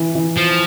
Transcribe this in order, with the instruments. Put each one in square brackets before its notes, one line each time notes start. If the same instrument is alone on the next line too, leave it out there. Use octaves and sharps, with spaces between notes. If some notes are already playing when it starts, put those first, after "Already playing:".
Already playing: [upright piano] E3
E3
[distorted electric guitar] F3